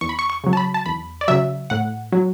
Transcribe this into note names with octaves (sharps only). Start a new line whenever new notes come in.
E2 C#6
B5
C#6
C#6
C#3 F#3
A5
B5
A5
E2 B5
D5
C#3 F#3 E5
A2 F#5
F#3